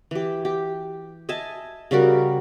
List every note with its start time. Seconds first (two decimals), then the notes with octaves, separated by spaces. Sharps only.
0.11 E3 G4
0.45 G4
1.29 D#5 E5 G#5 A5
1.91 C#3 G3 F#4 A#4